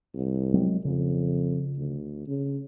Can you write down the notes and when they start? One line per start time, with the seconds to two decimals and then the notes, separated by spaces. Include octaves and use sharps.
0.14 C2
0.54 F#3 G#3 C4
0.85 F2 C#3
1.78 D2
2.28 C#3